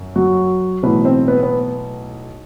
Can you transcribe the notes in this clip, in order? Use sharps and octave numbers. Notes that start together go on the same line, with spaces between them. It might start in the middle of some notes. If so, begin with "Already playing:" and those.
Already playing: F#2
F#3 F#4
B1 A2 E3 B3 B4
C4 C5
B3 B4
B3 B4